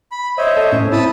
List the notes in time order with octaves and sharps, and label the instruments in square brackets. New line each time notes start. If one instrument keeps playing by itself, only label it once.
[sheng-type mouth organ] B5
[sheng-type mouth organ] C5 C#5 E5 [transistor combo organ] D#5
[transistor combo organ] A4 D#5
A2 C#4
[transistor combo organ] C4 E4 [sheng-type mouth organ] A5 B5 D#6